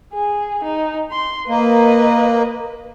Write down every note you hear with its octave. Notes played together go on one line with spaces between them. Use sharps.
G#4
D#4
C6
A#3 B4 D#5